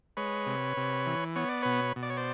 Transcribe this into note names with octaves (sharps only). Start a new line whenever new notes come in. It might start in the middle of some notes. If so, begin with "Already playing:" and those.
G#3 B4 C#5
C3
C3
E3
B3 C#5
D5
B2 B4 C#5
B2
D5
C#5
C5 D5